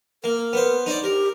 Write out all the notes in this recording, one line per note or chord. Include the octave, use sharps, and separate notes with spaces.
A#3 A#4
B3 C5
D#4 C5 D5
G4 A#4